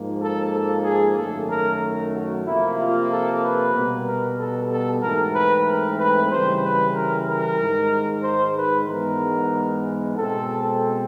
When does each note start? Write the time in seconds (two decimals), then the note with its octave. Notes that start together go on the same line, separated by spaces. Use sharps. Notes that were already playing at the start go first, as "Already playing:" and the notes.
Already playing: G#2 F3 A#3
0.19 A4
0.51 A4
0.83 G#4
1.16 F#2 D#3 F#3 A3 A4
1.48 A#4
2.12 F#4
2.44 C3 F3 A#3 E4
2.77 F4
3.09 A4
3.41 B4
3.73 B2 G3 B3
4.05 A#4
4.37 A4
4.70 A4
5.01 G#2 E3 A3 C4 A#4
5.34 B4
5.66 A#4
5.98 B4
6.30 C#3 E3 G3 C5
6.62 B4
6.94 A#4
7.27 A#4
7.59 G#2 D#3 G#3
8.23 C5
8.56 B4
8.87 G#2 E3 G#3 B3 A#4
10.16 B2 G#3 C4 A4